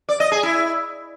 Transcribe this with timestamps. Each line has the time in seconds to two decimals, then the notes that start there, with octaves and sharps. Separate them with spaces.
0.09 D5
0.20 D#5
0.32 G#4
0.43 E4